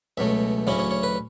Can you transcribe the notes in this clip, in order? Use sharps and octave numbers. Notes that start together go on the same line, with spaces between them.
C#2 B2 F#3 A3 E5
D2 C#3 F#3 C#4 E4
C#5
C#5
B4